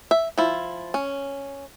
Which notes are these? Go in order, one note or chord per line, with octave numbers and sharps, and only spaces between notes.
E5
F3 E4
C#4